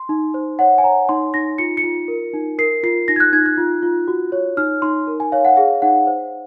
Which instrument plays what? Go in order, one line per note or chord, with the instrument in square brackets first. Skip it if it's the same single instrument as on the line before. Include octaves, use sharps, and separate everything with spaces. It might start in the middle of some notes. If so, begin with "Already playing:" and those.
Already playing: [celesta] C6
D#4
C5
C#5 F#5
G#5
C#5 A#5
D#4 C6
D#4 A#6
F4 C#7
C#7
F4
A#4
D#4
A#4 C7
F4 C7
D#4 A#6
G#6
F#6
D#4 G#6
F#6
F4
F4
F#4
C#5
D#4 F6
D#4 C6
A#4
G#5
C#5 F5
F#5
G#4 F5
D#4 F#5
C5